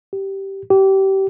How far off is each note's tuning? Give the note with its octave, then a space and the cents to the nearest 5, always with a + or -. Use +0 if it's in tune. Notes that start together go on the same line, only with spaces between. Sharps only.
G4 -10
G4 -25